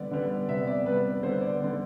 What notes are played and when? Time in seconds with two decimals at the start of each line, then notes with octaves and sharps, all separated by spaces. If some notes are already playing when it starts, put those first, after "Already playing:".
Already playing: D3 G3 B3 D5
0.11 D3 G3 B3
0.49 C3 G3 B3 E5
0.67 D5
0.86 C3 G3 B3 B4
1.23 D3 G3 B3 C5
1.41 D5
1.60 D3 G3 B3